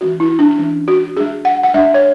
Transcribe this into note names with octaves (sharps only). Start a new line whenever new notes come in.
E3 G#3 C#4 F#4
E4
D4
E3 G#3 C#4
F#4
G#3 D4 G#4
F#5
F#5
G#3 D4 E5
C#5